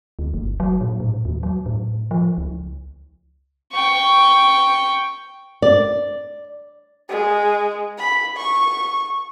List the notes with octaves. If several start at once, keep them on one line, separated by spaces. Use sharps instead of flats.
D2
G1
F#3
A#2
A2
D#2
F#3
A2
F3
C#2
G5 C#6
D5
G#3
B5
C#6